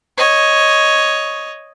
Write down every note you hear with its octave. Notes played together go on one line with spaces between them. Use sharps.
C#5 D#5